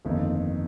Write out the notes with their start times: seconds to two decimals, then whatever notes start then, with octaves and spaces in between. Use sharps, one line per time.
0.05 G1 F2 D#3 A#3 D#4